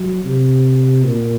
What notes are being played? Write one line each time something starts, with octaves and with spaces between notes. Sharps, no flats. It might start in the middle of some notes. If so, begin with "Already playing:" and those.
Already playing: F#3
C3
A#2